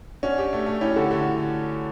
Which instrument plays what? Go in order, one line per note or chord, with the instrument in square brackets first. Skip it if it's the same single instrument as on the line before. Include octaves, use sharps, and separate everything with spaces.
[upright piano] C#4 [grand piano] D4 F#4
[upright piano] G4
A3
A3
[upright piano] C#4 [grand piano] E4 G4
[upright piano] D3 [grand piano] F#4 A4
[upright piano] D3